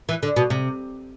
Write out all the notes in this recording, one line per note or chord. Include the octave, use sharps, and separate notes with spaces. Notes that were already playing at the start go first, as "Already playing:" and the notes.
E3
D3
B2
C3